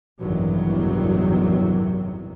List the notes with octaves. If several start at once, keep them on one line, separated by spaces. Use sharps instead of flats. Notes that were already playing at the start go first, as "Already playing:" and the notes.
A1 E2 G2 C3 D#3 F#3